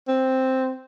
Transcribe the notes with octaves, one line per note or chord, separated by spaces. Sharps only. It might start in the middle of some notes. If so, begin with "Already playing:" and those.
C4